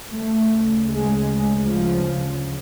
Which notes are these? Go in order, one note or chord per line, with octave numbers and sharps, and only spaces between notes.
D2 C#3 A3
G#3
F3